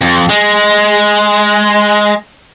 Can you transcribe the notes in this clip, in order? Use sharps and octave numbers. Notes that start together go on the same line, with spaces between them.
F2
G#3